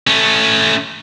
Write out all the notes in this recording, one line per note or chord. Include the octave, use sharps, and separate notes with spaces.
A3 C#4